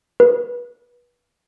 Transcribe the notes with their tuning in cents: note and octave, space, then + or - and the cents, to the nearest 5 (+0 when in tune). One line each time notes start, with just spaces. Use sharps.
B4 -25